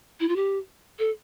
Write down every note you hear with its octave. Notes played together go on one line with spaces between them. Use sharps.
E4
F4
G4
A4